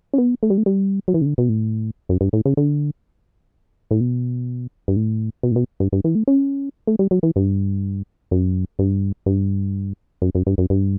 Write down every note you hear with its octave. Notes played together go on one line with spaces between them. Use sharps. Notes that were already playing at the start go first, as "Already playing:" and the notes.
C#4
B3
A3
G3
A3
G3
F#3
E3
C#3
D3
B2
A2
F#2
G2
A2
C#3
D3
A2
B2
G2
A2
B2
A2
B2
G2
G2
E3
A3
C#4
A3
G3
F#3
E3
G2
F#2
G2
G2
F#2
F#2
G2
F#2
G2